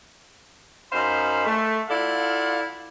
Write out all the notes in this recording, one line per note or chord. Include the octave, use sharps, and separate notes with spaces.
F#2 D#4 C5 F5 B5 C6
A3
E4 F4 A4 D5 F5 F#5